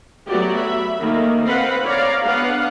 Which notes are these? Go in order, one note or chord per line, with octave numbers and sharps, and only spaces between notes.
F#3 A3 B3 F#4 G4 D5
E5 B5
D#3 A3 A#3
C4 B4 F5 F#5 B5
C#5 D5 F5 A#5
B3 D4 B4 F5 F#5